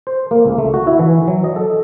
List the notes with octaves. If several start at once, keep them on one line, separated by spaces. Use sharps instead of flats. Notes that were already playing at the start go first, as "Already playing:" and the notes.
C5
A#3
C#2
A3
F#4
E4
E3
F#3
D#5
A4